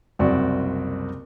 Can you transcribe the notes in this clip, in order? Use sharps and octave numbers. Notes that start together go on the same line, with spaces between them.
F#1 C2 C4 F#4 D5